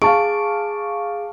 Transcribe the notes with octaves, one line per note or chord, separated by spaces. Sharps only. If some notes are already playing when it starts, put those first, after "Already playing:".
G#4 F5 A5 C#6 D7